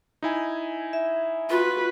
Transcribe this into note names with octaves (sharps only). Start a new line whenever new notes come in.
D#4 E4 G#5
E5
F4 F#4 B4